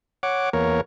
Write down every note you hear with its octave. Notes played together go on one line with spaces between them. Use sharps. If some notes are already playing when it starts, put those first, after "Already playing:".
C#5 F#5 D6
E2 A#3 A#4 C#5